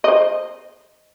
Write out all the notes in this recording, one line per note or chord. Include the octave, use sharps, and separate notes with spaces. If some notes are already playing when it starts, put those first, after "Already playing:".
C5 D#5